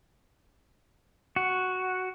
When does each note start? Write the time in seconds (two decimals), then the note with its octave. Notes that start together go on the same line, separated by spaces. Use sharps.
1.36 F#4